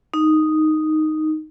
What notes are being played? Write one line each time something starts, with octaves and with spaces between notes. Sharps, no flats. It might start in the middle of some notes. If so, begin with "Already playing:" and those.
D#4